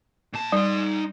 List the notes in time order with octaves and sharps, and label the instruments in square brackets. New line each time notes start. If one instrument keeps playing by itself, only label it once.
[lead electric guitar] A#2 A5
[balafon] G3 [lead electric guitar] D#4 C6